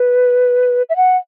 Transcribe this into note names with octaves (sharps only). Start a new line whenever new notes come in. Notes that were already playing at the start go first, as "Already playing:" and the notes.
Already playing: B4
E5
F#5